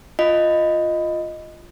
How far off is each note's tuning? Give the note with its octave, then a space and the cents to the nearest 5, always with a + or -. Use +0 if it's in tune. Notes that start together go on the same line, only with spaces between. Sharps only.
F4 +0 D#5 +0